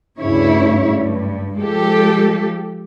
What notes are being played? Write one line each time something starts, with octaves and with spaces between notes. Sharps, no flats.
D2 G2 C#3 E4 C#5
G2
F3 G#3 G4 A4